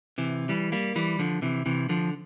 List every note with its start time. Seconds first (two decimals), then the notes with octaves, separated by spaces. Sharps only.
0.18 C3 E3
0.49 E3 G3
0.72 G3 A#3
0.96 E3 G3
1.19 D3 F3
1.42 C3 E3
1.66 C3 E3
1.89 D3 F3